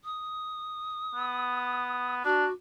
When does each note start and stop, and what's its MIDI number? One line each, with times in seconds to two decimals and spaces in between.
0.04 2.15 87
1.15 2.21 59
2.25 2.46 62
2.25 2.52 66